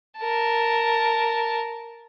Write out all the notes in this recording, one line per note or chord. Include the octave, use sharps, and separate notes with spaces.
A#4 A5